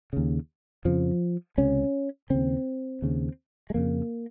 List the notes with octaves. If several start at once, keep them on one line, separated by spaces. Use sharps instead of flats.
D#2 C#3
F2 C#3 F3
C#2 C3 C#4
D#2 C#3 C4
D#2 C#3
G#3
F2 C#3 A#3